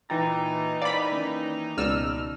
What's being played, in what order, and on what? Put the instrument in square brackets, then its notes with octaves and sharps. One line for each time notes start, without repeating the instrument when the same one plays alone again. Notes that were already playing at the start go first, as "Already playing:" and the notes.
[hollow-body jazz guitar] A#2 A#5 [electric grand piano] E3 G5 A6 [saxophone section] D#4
[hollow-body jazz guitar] A#4 C5 F5 [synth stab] D5 B5
[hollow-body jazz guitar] D#3 A#3 C#4
[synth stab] C#2 E6 F6 [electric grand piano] B2 D5